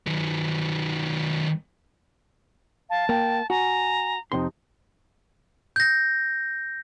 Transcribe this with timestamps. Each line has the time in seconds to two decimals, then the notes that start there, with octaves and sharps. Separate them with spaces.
0.07 D#3 F#3
2.90 F5 A5
3.09 A#3 G5
3.50 F#4 G#5 A#5
4.32 F2 C3 D#4 C6
5.76 G6 A#6